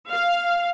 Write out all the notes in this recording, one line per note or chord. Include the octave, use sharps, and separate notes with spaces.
F5